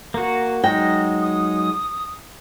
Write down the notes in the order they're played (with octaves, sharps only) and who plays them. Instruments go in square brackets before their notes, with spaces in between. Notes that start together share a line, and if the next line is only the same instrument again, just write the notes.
[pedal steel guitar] A#3 F#4 [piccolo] A#5
[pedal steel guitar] F#3 G#3 D#4 [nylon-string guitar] G5 [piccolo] A#6
[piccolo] D#6